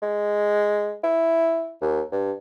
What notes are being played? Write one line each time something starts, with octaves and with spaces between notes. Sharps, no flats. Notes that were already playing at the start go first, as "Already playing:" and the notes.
G#3
E4
D#2
G2